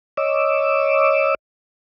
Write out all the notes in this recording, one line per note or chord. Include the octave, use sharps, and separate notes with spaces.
C#5 D#5 D6 E6